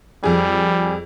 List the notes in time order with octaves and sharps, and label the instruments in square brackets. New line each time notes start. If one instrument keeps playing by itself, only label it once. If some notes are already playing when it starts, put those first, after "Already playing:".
[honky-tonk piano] F2 G#4 [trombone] G3